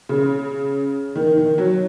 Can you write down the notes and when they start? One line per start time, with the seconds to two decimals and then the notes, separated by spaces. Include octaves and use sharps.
0.09 C#3
1.15 D#3
1.38 D#3
1.58 F#3